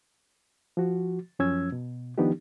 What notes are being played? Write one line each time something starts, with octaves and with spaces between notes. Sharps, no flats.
F3 F#4
F#2 F3 C#4 E6 G#6
B2
D#3 F3 B3 D4 D#4 G4